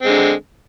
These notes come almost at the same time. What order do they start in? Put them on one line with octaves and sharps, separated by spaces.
C4 G#3 D3